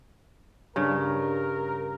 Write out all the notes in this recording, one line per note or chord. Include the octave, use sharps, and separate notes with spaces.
G2 C#3 A#4